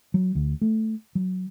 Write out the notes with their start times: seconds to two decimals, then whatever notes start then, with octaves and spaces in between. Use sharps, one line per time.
0.14 F#3
0.35 D2
0.61 A3
1.15 F#3